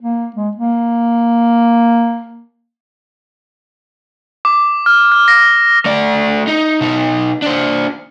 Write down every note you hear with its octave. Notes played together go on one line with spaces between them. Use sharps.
A#3
G#3
A#3
D6
F6
F6
A#6
A3 D5
D#4
B2 D#4
D4 C5